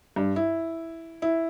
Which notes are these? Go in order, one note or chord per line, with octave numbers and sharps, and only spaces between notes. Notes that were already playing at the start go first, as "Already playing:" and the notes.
G2
E4
E4